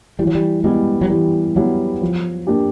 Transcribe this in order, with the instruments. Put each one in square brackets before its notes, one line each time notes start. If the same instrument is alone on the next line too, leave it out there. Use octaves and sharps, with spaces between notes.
[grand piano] E3 [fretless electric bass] G3
[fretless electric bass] F#3
G3
[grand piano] G3 B3 E4 [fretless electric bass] G#3
[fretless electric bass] F#3
[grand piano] E3 [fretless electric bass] G3
[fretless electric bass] F#3 [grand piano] G3 B3 E4
[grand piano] F3
A#3 D4 G4